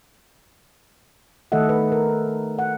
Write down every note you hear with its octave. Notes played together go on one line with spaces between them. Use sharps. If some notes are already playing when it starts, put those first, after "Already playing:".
D#3 A3 A4 D#5 E5 F#5
B4
A#4
F#5